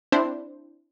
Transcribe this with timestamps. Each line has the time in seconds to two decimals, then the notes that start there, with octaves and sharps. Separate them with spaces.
0.12 C4 D4 E4 C5